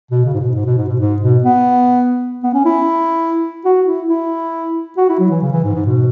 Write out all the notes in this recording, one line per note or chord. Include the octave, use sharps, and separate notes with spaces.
B2
C#3
G#2
B2
G#2
B2
G#2
B2
G#2
B2
B3
B3
C#4
E4
F#4
E4
E4
F#4
E4
F#3
E3
C#3
E3
G#2
G#2
B2